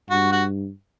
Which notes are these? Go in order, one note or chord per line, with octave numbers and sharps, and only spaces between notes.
G2 F#4
F#4